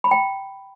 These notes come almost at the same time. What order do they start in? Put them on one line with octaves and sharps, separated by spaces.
B5 A#5 G5